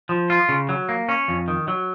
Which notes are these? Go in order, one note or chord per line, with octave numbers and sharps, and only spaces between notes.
F3
F4
C#3
F#3
A#3
C#4
F2
D#3
F#3